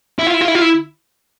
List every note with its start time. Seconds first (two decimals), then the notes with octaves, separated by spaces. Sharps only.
0.19 E4
0.27 F4
0.34 E4
0.41 F4
0.48 E4
0.54 F4
0.62 E4